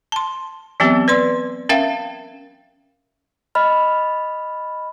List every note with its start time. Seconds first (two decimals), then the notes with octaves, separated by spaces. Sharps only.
0.12 A5 C6
0.80 E3 F#3 B3 C4 G4
1.08 B4 D5 C6
1.69 C#4 A#4 E5 F5 G5
3.55 D#5 B5 F6